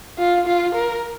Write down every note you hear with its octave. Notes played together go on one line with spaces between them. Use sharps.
F4
F4
A#4